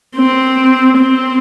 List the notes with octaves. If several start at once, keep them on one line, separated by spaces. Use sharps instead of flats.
C4
C4